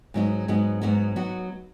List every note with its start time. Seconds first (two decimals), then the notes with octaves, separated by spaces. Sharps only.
0.14 G#2 F#3 B3 D#4 F#4
0.48 G#2 F#3 B3 D#4 F#4
0.81 G#2 F#3 B3 D#4 F#4
1.16 F#3 B3 D#4 F#4